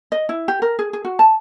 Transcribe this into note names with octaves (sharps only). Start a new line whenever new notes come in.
D#5
E4
G4
A#4
G#4
G#4
F#4
A5